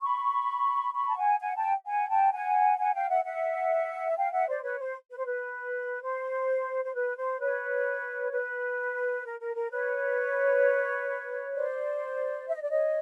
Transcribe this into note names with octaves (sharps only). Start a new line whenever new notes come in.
B5 C#6
B5 C#6
A5
F#5 G#5
F#5 G#5
G5 A5
F#5 G#5
G5 A5
F#5 G#5
F#5 G#5
F5 G5
E5 F#5
E5 F#5
F5 G5
E5 F#5
C5 D5
B4 C#5
C5
B4
C5
B4
C5
C5
B4
C5
B4 C#5
B4
A#4
A#4
A#4
B4 C#5
C5 D5
E5
D#5
D5
C#5 D#5